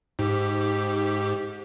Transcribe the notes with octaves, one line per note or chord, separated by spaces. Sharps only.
G#2 G4